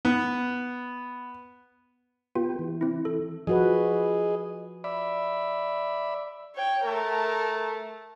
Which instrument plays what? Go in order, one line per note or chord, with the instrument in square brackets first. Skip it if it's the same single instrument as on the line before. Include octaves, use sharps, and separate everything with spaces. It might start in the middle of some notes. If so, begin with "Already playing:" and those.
[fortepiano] B3
[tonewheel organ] B3 G4 [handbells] F4
[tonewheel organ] E3
[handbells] C4 E4
A4
[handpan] F3 F#4 B4 [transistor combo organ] G#4 D#5
[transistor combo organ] D5 E5 B5
[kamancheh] C#5 G5
[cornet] A3 [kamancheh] A#4 A5